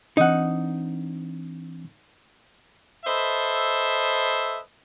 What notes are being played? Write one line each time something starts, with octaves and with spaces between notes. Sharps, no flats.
E3 C4 D4 D#4 F#5
A4 B4 C5 D#5 E5